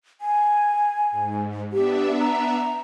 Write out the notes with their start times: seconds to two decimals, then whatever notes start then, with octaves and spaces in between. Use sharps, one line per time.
0.21 G#5
1.11 G#2
1.73 B3 D4 G4 E5
2.19 A#5